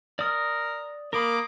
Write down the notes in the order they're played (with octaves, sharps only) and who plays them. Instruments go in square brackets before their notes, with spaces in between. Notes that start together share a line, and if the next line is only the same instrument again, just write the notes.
[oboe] A#4 [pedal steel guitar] D5 D#6
[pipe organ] A#3 D6 [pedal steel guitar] A#4 B5 [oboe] D#5